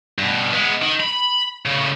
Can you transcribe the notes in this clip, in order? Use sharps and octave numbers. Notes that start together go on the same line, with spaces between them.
G2 B2
G#3 B3
D#3
B5
A2 C#3